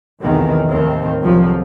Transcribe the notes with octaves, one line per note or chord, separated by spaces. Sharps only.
F1 B1 E2 D#3 E3
D#2 A2 D#3 C4
G1 C2 F2 F3 F#3